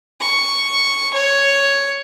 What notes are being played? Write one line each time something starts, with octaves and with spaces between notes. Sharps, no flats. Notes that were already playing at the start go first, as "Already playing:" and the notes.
C#6
C#5